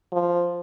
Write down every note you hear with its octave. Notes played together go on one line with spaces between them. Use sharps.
F3